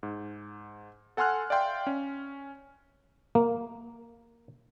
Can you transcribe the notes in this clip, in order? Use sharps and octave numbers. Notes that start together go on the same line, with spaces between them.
G#2
A4 F#5 G#5 C6 F6 F#6
D5 E5 F5 G5 C6
C#4
A#3